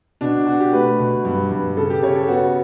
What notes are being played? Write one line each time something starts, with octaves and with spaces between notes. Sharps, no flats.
B2 D4
B2 F#4
G4
A3 B4
B2
G2
G2
C#3 A4
G4
C#3 C#5
A4
B3 F#4